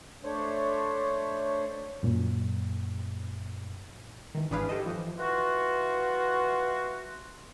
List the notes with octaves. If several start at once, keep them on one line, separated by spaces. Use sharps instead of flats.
A3 D4 C5 C#5
F#2 A#2
D#3 E3
G#1 E3 D4 G#4 B4 F5
G4 A4 C5 D#5
E3 F3
E3 F4 F#4